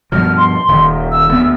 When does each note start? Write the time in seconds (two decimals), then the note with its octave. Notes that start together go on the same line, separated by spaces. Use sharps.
0.12 G2 B2 F3 F6
0.37 C6
0.68 D#1 D#3
1.11 E6
1.29 D2 B3